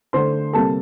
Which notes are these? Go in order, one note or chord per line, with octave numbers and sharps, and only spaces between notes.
D3 A3 C5 C6
C3 G3 A#3 A4 A5